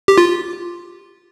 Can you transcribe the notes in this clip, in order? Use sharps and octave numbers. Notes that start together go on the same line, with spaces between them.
G4
F4